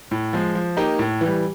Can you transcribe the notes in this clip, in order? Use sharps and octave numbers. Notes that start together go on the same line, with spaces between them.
A2
F3 G#3
F3
A#3 D#4 G4
A2
E3 G3